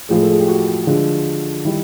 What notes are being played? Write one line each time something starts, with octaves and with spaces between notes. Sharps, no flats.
A2 F3 G#3 G#4
A4
G#4
G4
F#4
D3 F3 G#3
D#3 G3 E4